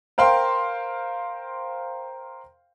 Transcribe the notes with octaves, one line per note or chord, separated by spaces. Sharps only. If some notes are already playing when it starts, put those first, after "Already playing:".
A#4 C5 F5 G5 C6